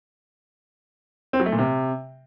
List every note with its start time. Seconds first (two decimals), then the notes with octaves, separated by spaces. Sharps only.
1.33 C4
1.40 F#3
1.46 A3
1.52 A#2
1.58 C3